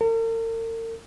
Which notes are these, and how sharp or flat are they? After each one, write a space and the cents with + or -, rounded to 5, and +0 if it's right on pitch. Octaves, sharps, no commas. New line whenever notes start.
A#4 -45